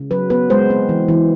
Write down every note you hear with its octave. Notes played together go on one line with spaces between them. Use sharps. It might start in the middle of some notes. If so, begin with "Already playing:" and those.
Already playing: C#3
F#3 B4
B3 B4
G#3 C5
C4
E3
E3